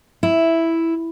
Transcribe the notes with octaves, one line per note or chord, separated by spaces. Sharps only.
E4